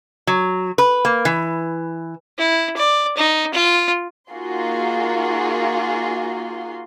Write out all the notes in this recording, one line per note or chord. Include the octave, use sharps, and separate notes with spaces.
F#3
B4
A#3
E3
E4
D5
D#4
F4
A#3 D#4 F4 F#4 G#4 C6